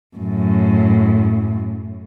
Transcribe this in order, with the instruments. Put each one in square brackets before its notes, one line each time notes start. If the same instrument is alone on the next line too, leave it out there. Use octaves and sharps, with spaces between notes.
[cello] F#2 A2